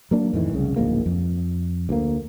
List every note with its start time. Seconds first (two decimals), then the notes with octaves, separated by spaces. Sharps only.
0.11 F#3 A#3 D4
0.33 F2 A2 D#3 E3
0.53 C2 C#3
0.76 D1 A#1 G#2 A#3
1.06 F2
1.89 D2 A#3